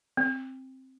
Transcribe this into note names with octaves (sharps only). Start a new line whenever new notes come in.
C4